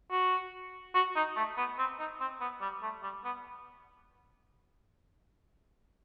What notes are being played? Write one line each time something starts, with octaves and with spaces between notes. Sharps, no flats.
F#4
F#4
D#4
A3
B3
C4
D#4
C4
B3
G3
A3
G3
B3